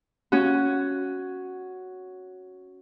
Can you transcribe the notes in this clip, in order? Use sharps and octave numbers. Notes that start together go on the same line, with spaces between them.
C#4 F#4